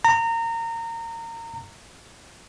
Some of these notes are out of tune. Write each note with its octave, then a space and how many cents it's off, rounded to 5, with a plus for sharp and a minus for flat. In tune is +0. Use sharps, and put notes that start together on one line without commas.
A#5 -25